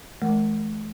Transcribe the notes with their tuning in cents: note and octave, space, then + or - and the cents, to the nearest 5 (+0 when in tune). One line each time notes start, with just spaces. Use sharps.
E3 +0 A3 -45 A#4 +0